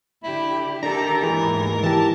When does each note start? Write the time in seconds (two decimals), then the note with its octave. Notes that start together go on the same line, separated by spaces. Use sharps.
0.24 D3 E4 G4
0.83 D#3 D4 G4 A4 A#4 A#5
1.23 D#2 G#2 E3 G#4
1.83 E3 G4 A5